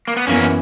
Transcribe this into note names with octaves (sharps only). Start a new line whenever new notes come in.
A#3
B3
F#2 E3 A#3 B3 C#4